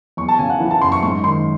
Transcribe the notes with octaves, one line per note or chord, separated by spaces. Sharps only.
E2 C#6
A5
C#3 G#5
F#5
E3
A5
F#1 C6
C#6
G#2 C#6
D#3 C6